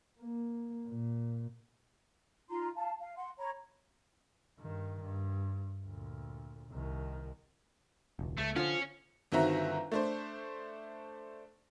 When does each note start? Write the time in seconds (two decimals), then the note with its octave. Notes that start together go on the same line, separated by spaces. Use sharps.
0.20 A#3
0.88 A#2
2.49 D#4 F4 A#5 C6
2.75 F5 A5
3.01 F5
3.16 F#5 C6
3.38 C#5 A#5 B5
4.59 G2 D#3
5.01 G2
5.86 D2 A#2
6.70 C2 D#3
8.19 E1 C#2
8.38 C#2 A3
8.56 D3 C#4 F4 C5
9.32 G1 D#3 C4 F#4 E5 A#5
9.92 A3 D4 C5